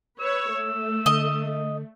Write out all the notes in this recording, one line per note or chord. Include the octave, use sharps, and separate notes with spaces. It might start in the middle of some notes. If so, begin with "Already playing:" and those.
B4 C#5 E6
A3
D3 D#5